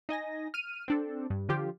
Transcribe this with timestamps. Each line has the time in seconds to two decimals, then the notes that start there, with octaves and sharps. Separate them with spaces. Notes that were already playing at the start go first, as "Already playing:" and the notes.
0.09 D#4 D#5 G#5 A#6
0.54 F6 D#7
0.88 C4 D4 A4
1.30 G2
1.49 D3 F3 F4 G4